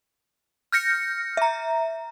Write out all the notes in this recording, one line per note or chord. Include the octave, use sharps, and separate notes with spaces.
F6 G6 A#6 C#7
E5 A#5